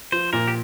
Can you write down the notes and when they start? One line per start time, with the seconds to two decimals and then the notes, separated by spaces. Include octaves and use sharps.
0.12 F3 C5
0.33 A#2 A#4
0.48 G4